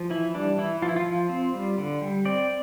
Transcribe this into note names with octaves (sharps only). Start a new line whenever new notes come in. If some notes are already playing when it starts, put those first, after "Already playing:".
Already playing: F3
E3 E4
G3 D4
E3 E4
F3 F4
E4
F4
F3
C4
G3
D3
G3
C4 D5